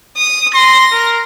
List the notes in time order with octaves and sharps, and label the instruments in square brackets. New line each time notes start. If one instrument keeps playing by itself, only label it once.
[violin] D#6
[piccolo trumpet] C6 [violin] A#6
[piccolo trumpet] A#4